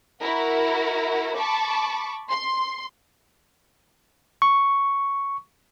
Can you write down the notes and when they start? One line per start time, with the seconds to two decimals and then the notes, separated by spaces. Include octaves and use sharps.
0.22 E4 F#4 A#4
1.37 A5 B5 C#6 D6
2.29 C6
4.42 C#6